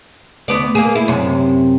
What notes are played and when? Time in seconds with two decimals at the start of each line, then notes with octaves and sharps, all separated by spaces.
0.48 D2 B3 D5
0.75 A#3 G#4
0.96 E4
1.08 F#2 C3